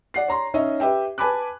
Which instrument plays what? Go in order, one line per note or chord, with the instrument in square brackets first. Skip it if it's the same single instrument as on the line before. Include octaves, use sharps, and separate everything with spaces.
[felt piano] D5 F#5 C7
C#5 A#5 C6
C#4 D#4 C#5 D#5 E5
G4 B4 E5 G5
B4 G#5 A5 B5 D6 F#6